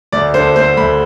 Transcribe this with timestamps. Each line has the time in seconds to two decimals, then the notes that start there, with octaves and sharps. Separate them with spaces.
0.12 D2 D5
0.34 D3 C5
0.56 A3 C5
0.77 D2 B5